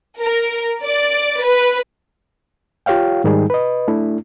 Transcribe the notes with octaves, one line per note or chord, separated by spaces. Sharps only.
A#4
D5
B4
F4 G4 C#5 F5 G5
G#2 D#3 G3 D#4 G#4
B4 D#5
A3 D4 E4